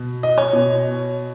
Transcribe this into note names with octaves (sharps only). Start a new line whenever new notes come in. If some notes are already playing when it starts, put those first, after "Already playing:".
Already playing: B2
D#5
C#5
B2